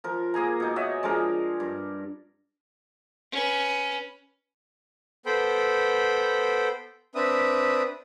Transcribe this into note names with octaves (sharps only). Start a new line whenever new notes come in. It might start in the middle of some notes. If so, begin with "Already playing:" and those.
F3 A#4
A#3 G#4 G#5 A#5
B2 D#4
C#5 D#5 E5 F#5
F3 G#3 D4 A#4
G2
C#4 B4
B3 A4 C5 G5 B5
C4 D4 B4 E5 D#6